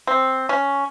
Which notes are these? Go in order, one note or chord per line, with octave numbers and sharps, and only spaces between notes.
C4
C#4